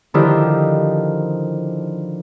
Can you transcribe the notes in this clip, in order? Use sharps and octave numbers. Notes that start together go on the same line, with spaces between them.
D3 D#3 F3 E4 G4